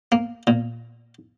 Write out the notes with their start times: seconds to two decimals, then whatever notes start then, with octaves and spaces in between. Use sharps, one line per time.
0.12 A#3
0.47 A#2